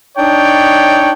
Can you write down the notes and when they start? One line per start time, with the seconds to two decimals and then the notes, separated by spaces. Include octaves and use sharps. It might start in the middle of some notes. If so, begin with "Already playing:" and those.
0.17 D4 D#4 C#5 G5